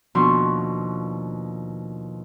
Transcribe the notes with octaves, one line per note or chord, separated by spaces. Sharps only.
D#2 B2 F3 D4 C6 C#6